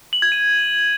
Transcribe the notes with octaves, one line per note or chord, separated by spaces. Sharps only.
F#7
G#6
D#7